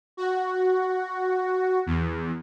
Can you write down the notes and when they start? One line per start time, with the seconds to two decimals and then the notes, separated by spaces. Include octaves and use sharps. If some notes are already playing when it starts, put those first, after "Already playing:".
0.17 F#4
1.86 E2